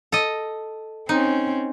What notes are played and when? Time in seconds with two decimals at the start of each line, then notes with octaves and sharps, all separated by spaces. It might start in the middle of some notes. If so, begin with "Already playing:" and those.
0.12 A4 D#5
1.09 C4 C#4 D#4